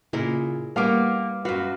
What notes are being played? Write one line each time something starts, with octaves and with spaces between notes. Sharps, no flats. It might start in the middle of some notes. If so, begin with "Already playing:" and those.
A#2 C#3 E4 G#4 A#4
G3 A#3 B3 C#4 F5 D6
F#2 F#4 B4 F5